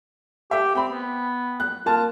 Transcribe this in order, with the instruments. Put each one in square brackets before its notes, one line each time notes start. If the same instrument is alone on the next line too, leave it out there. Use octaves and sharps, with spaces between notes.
[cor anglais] G4 [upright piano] E5
[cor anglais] C4 [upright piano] G5 B5
[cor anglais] B3
[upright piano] F#6
[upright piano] A#3 A5 [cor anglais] F4